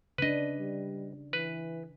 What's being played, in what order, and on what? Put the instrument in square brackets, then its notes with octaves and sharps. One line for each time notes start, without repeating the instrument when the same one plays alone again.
[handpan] C#3 D4 [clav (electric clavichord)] B4 D#5
[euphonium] G3
[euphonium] E3 [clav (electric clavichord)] B4